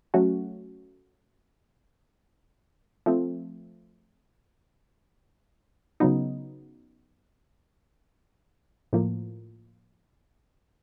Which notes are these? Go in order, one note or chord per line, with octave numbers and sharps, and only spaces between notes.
F#3 A3 C#4 F#4
F3 A3 C4
C#3 F#3 B3 D#4
A2 F3 A#3